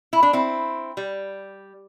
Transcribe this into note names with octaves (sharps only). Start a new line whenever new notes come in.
E4
D4
C4 E4
G3